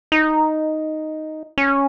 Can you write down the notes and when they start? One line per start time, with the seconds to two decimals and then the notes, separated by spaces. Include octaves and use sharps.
0.12 D#4
1.58 C#4